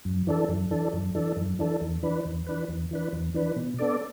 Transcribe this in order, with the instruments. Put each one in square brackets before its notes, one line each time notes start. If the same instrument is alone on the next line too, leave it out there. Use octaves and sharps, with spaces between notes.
[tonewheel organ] F#2
E3 D4 A4
F#2
E3 D4 A4
F#2
E3 D4 A4
F#2
E3 D4 A4
E2
E3 D4 B4
E2
E3 D4 B4
E2
E3 D4 B4
E2
E3 D4 B4
B2
B3 D4 A4 D5